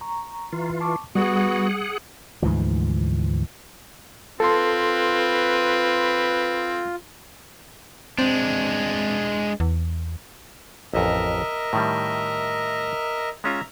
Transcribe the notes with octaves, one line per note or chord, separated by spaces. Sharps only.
A#5 C#6
E3 F4
A5 C#6 D6
G3 B3 F#4 G#4 F#5
D2 G#2 E3 F3
C4 F4 A4 B4 C6
G#3 C4 D4
E2
A1 F2 A#4 D#5 E5
A2 D#3 G3
G#3 C#4 F4 E5 A#5